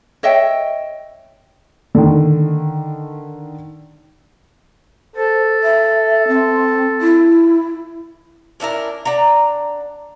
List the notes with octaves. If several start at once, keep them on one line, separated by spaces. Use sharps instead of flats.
C#5 D#5 E5 G5
D3 D#3
A4 C5
E5
C4
E4
C#4 D4 E4 A#4
D4 F#5 A#5